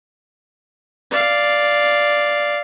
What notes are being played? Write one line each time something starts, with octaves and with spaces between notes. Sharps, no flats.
D5 F5